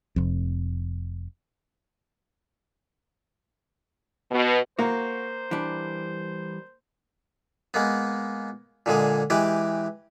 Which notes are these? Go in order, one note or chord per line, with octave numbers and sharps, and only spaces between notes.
F1 F2
B2
A#3 F#4 C5
E3 G3 D4
G#3 A#3 B3
A#2 D3 G#3 G#4
E3 G#3 G4 B4